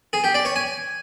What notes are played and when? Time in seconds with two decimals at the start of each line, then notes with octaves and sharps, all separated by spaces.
0.13 G#4
0.24 G4
0.34 D5
0.45 C#5
0.56 G#5